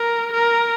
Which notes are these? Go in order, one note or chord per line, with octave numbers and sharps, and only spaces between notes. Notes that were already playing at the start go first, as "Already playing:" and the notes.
Already playing: A#4
A#4